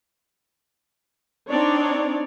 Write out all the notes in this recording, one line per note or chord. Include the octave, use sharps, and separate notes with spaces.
C4 D4 D#4 C#5 D5